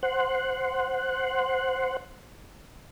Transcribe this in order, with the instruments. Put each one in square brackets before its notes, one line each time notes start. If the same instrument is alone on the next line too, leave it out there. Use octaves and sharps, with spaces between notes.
[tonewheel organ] C5 F#5